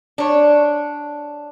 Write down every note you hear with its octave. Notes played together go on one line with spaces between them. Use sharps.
D4 C#5